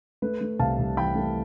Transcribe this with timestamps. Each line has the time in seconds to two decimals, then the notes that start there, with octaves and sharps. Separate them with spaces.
0.22 A3 B4
0.41 A3
0.59 C2 F5 A5
0.79 C2
0.97 E3 G5 B5
1.15 A3